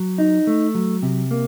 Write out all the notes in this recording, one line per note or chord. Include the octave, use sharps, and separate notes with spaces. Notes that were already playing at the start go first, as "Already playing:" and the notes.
Already playing: F#3
D#4
A3
F#3
C3
A#3